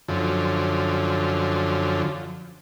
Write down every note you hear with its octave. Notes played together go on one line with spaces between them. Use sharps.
F#2 D3 F3